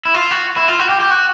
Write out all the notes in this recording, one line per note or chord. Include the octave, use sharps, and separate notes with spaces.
E4
F4
F#4
E4
F4
F#4
G4
G4
F#4